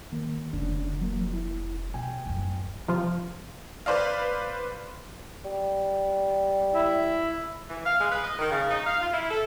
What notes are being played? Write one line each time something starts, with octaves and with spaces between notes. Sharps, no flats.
D#3 A#3
F1 D3 C#4 D4
F3 F#3 A#3
E4
B2 G5 G#5
D1 F#2
C3 F3 F4
B4 C5 D5 F5
G3
E4
E3
F5
G#3
B4
D#5
D#3
C#3
D#4
F5
F4
E4
A4